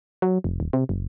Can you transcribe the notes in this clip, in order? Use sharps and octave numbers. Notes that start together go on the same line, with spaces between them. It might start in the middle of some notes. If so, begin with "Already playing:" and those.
F#3
F1
D#1
C3
F#1